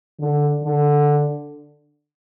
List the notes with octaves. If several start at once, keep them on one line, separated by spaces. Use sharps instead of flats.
D3
D3